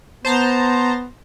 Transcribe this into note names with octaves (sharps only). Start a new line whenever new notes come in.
B3 C5 A5 A#5